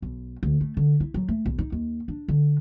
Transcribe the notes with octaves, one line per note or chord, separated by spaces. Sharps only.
B1
D2
A3
D3
E4
F#3
A3
B1
D#4
D#2
D4
D3